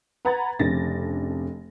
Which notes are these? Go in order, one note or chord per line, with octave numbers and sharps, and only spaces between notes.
B4 F#5 A#5 B5 G#6 A6
F1 F2 C#3 D4 A6 A#6